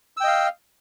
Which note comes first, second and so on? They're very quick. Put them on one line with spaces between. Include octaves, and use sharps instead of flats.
E6 G5 D#5 F5